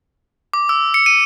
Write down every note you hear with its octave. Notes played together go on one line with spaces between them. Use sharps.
D6
E6
C#7
D#7